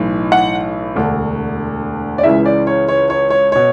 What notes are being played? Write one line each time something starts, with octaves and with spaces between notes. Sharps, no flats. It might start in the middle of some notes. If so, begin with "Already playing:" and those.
Already playing: B1 A2 E3
F#5
E1 D2 D3
D5
C#2 C#3 E3 E5
D5
C#5
C#5
C#5
C#5
B2 C#5